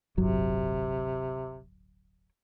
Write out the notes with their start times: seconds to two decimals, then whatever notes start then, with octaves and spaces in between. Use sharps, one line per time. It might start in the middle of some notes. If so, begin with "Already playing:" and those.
0.17 D1 G1 C3 F#3